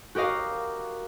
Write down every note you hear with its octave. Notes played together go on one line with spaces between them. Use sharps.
F#4 G4 A#4 D#5 F5